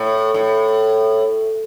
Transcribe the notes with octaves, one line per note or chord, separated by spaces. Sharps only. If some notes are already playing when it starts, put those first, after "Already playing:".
Already playing: A2
A2